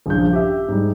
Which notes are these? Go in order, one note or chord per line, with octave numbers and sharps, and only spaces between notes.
A#1 G2 C#3 F3 G6
G4 E5
G#2 G3